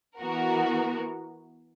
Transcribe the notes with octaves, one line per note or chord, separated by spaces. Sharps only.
E3 B3 F#4 A#4